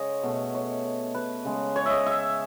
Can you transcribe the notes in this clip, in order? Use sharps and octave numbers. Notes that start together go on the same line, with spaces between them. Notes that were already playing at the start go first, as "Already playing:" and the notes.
Already playing: C#3 G#3 C#5 D#5
B2 A3
C#5
B4
C#3 G#3
C#5
D#5 E5
E5